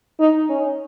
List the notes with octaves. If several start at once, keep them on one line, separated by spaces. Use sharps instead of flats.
D#4
C#4